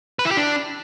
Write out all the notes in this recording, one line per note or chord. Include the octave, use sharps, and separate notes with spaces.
B4
E4
G4
D4